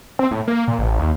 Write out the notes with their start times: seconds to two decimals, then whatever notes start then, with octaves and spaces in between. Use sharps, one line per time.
0.19 C4
0.31 A2
0.48 A#3
0.68 A#2
0.79 A1
0.99 D#2